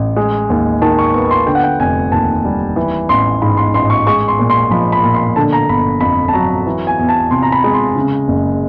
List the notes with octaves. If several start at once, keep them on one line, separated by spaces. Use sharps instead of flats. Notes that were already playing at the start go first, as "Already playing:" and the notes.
Already playing: A1
G#3
D#2
D#3 A5
C#6
B3 C#6
C#6
C6
D3 G5
F#5
G5
F1 G#5
D#2 A5
G3
E3
A1 C6
G#2 B5
C6
A1 C6
C#6
G#3 C#6
C6
A#2
C6
F3 B5
B5
A#2
C6
D3 A5
A#5
G1 B5
F2 B5
A5
F#3 A#5
E3
G#5
E2
A5
C3 C6
A#5
B5
G#3
C6
C#3
F#1